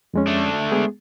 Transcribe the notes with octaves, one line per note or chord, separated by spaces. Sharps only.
F2 G#3 C#4
A3 D4
G#3 B3 G#4